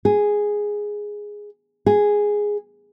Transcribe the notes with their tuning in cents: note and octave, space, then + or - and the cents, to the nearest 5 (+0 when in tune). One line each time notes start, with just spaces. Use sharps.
G#4 +0
G#4 -5